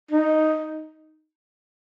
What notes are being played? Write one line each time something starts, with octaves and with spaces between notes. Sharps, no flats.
D#4